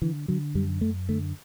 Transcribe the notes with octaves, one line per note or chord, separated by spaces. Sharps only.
D3 E3
D3 F#3
F#2 G3
F#2 A3
D3 A3